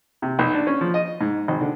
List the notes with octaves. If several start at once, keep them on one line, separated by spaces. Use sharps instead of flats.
C3
B1
D4
C#4
F3
D#5
G#2
G#1
D3